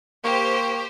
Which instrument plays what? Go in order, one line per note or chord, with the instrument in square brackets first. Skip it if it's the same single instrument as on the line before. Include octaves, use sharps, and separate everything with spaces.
[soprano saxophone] A#3 [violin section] G4 C5 [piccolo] C#6